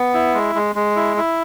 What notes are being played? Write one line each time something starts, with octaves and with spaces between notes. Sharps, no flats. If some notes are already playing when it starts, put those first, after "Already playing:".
Already playing: B3
E4
G#3
G#3
G#3
E4
E4